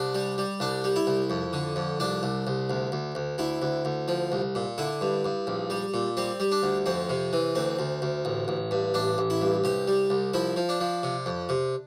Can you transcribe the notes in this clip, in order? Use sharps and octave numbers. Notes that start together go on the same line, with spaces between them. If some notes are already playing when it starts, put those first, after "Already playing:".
Already playing: C2 D4
G3
G3
C2 D4
G3
E4
C2
F2
D3
F2
C2 D4
C2
C2
D2
D2
D2
D2 E4
D2
D2
F3
C2
A#2
D3 E4
G2
G2
A#1
G3
A#2
G3 C4
G3
D4
D2
F2 C4
C3
E3
D2 C4
D2
D2
A1
A1
G2
A1 D4
A1
E4
G2
C2 G4
G3
C2
F3 E4
F3
D4
F3
C3
F2
C3